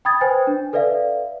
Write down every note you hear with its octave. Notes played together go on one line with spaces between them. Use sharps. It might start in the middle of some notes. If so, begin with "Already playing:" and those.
G5 B5 D#6 G#6 A6
B4 C5 G5 G#5
D4
A4 B4 D5 E5 F5